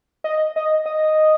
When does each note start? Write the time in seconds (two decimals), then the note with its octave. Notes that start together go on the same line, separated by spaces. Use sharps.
0.24 D#5
0.56 D#5
0.86 D#5